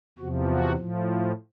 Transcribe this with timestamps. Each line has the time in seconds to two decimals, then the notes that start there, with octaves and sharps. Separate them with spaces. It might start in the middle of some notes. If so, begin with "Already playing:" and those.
0.18 E2 C3 F3 F#4
0.47 F#4
0.75 A2 F3